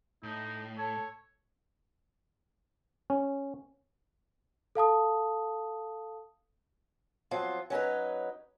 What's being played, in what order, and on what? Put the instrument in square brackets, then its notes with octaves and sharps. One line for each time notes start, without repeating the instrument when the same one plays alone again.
[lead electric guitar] A2 [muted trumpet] D#4
[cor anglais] A4 [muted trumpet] C#5
[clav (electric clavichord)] C#4
[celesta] A4 F5 A5 D#6
[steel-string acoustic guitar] F3 F#3 C4 F4
F#3 C#4 D#4 B4